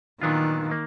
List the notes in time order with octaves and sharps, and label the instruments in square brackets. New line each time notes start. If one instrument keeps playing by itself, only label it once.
[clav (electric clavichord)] A#2 F#3 B3 D4 F4 [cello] D#3
[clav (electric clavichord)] A#3